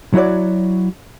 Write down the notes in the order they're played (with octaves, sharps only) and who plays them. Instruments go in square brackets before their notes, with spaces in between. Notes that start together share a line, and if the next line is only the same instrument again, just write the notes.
[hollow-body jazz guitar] F#3 E4 F#4 C#5 D5